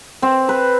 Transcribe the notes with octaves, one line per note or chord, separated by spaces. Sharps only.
C4
B4